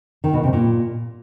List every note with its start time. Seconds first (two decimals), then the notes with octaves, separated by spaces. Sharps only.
0.24 D#3
0.33 B2
0.43 C3
0.53 A#2